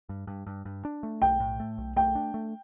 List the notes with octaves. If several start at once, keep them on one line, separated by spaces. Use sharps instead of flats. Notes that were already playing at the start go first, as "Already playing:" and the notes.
G2
G2
G2
G2
D4
A3
B1 G5
A2
A3
B1
A3 G5
D4
A3